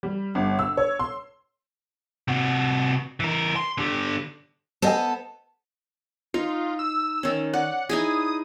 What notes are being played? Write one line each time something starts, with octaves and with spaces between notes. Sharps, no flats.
G3
G1
E6
C#5
C6
C3 F#4
E3 A#4
C6
D3 G4
B3 A4 C5 D#5 G#5
D#4 F4
E6
D#3 C#4
D5 F#5
D#4 E4 G#4 D#6